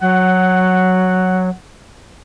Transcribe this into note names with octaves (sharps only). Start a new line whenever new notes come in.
F#3 F#5